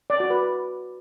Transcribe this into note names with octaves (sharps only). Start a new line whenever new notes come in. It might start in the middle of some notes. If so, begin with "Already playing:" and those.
D5
F#4
B4